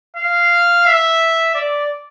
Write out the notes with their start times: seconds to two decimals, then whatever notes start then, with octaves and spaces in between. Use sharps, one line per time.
0.16 F5
0.86 E5
1.54 D5